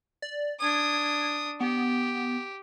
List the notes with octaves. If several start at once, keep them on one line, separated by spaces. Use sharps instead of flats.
D5
D4 D#6 G#6
B3 G4